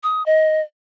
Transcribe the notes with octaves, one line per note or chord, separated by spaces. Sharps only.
D#6
D#5